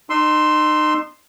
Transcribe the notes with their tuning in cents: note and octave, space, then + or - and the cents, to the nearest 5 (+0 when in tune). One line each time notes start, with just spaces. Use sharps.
D#4 -30 C6 +0 E6 +0